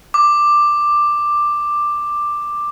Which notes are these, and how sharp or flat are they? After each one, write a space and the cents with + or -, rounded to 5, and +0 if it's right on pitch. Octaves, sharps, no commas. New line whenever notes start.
D6 +10